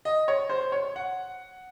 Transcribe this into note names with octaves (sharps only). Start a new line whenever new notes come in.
D#5
C#5
C5
C#5
F#5